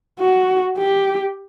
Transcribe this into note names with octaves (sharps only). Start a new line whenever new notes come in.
F#4
G4